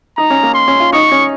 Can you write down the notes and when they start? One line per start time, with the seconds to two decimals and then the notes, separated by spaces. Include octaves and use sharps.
0.18 D#4 A#5
0.30 C#4
0.43 A#3
0.55 C6
0.68 C#4
0.80 F4
0.93 D#4 C#6
1.12 C#4